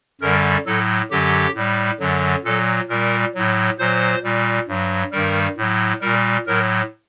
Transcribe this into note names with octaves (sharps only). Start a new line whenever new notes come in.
F#2 D3 G3 A#4
A2 F#3 A4
F#2 D3 F#3 G4
A2 G3
F#2 D3 F#3
A#2 F#3 A4
A#2 G3 A#4
A2 F#3
A#2 F#3 C5
A#2 G3
G2 F#3
G2 D#3 G3 A#4
A2 F#3
A#2 G3 A#4
A2 F#3 A#4